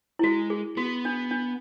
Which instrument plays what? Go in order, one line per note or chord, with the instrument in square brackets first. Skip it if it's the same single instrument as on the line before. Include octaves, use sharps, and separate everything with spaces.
[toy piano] E4
[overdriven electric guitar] G#3 [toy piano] F#4
[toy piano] G#4
[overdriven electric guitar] B3 [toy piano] F#4
[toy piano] D4
D4